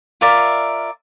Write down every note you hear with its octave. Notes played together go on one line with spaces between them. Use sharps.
F4 A#4 D5 E5